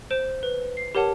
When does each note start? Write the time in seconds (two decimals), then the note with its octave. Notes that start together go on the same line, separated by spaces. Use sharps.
0.11 C5 D7 E7
0.43 B4
0.77 C7
0.95 G4 A#4 C#5 F#5 A5